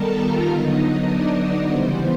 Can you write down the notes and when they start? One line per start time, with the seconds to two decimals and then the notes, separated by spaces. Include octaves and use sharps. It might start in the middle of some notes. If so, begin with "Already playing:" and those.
Already playing: D#3 G3 B3 A4 A#4 A5 A#5
0.20 F4 F5
0.50 D3 F#3 B3 D#4 D#5
1.08 D4 D5
1.67 C#3 E3 G3 B3 C5